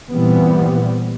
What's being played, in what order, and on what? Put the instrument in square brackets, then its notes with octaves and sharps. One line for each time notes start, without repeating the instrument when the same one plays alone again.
[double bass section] A#2 E3 G3 B3 C4